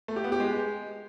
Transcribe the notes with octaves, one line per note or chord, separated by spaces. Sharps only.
A3
G4
B3
G4
G#3